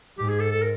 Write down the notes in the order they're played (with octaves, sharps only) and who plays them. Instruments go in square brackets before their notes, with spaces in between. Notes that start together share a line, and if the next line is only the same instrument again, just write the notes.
[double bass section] G#2 [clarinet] G4
[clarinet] G#4
A4
A4
A#4